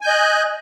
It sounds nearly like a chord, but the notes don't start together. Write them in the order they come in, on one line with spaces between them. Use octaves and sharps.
G#5 G6 D#5 F#6